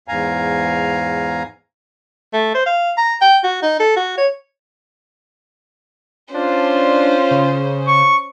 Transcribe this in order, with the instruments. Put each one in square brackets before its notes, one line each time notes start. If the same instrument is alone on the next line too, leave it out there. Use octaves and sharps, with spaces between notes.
[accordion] E2 G#2 F5 G#5 A#5
[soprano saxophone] A3
C5
F5
A#5
G5
F#4
D#4
A4
F#4
C#5
[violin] C#4 C5 [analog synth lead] D4 [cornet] F4
[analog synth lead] C#3
[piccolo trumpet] C#6